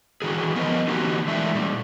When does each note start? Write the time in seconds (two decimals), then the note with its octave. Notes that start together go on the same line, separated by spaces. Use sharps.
0.22 D#3 E3 F#4 G#4
0.55 F3 B3 A#4 C5 D#5
0.88 D3 E3 A#3 D#4 F#4 G4
1.28 E3 G#3 A3 D4 E4 E5
1.55 A#2 G3